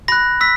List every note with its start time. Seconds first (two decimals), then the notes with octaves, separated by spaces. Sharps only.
0.08 B5 F#6 A#6
0.41 E6 B6